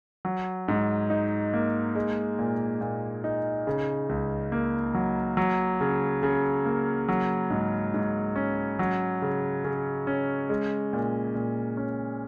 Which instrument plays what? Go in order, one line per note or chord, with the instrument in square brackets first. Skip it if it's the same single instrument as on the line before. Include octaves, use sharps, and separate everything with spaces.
[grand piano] F#3
G#2
D#4
A#3
G#3
A#2
A#2
D#4
C#3
C#2
A#3
F#3
F#3
C#3
C#3
A#3
F#3
G#2
G#2
C#4
F#3
C#3
C#3
C#4
G#3
A#2
A#2
C#4